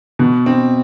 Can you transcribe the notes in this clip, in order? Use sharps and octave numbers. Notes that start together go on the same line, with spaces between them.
B2
C4